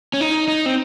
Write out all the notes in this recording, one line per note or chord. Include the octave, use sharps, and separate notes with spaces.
C#4
D#4
D#4
C4